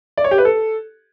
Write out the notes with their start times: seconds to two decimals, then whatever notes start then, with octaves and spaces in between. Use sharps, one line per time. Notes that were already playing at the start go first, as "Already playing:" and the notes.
0.17 D5
0.24 C#5
0.31 G4
0.38 B4
0.45 A4